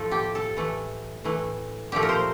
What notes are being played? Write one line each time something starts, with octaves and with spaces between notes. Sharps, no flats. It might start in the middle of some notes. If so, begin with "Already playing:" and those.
Already playing: A2 F3 A3 A4
G4
A4
A2 E3 A3
A2 E3 A3
A#2 F3 A3 G4
A#4
C5